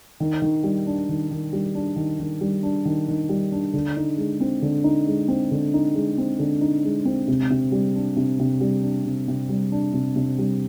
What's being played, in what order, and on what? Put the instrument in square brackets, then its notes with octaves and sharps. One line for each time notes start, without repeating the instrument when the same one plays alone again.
[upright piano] D#3
D#3
G3
D4
D#3
D#3
G3
D4
D#3
D#3
G3
D4
D#3
D#3
G3
D4
D3
D#4
G#3
C4
D3
D#4
G#3
C4
D3
D#4
G#3
C4
D3
D#4
G#3
C4
C3
C3
G3
D4
C3
C3
G3
D4
C3
C3
G3
D4
C3
C3
G3